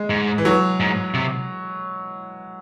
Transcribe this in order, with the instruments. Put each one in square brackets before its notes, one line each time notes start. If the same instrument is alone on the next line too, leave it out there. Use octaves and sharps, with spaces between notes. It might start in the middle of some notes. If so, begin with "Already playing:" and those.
Already playing: [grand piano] G#3
[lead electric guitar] G#2
[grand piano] E3
F#3
[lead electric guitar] G#2
C3